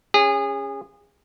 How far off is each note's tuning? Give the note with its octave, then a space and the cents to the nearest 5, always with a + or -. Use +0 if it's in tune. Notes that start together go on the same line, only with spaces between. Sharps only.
C#4 +0 G#4 -30